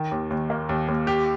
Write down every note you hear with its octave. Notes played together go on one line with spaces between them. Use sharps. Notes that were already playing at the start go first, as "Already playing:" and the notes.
Already playing: D#3
D#2
D#2
A#3
D#2
D#2
G4